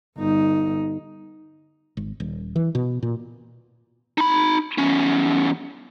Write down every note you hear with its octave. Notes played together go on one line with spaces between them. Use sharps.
G1 D#4
G#1
D#1
E3
B2
A#2
D#4 B5
E2 C#4